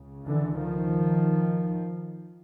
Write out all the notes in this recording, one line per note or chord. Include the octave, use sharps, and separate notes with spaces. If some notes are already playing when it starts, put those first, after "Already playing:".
Already playing: C#2 C#3
D3 E3
D#3 F3